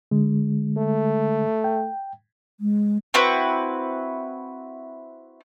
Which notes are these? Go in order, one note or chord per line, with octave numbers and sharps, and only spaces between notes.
D3 G#3
A3
G5
G#3
C4 E4 F#4 B4